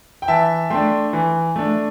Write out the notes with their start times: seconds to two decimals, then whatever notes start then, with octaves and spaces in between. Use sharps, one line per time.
0.22 G5
0.28 E3 E5 A5
0.70 A3 D4 G5 C6
1.13 E3
1.56 A3 D4